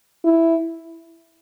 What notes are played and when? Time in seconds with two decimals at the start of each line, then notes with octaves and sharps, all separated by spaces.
0.24 E4